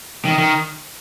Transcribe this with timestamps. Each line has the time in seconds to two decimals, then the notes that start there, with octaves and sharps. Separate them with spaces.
0.25 D#3
0.38 D#3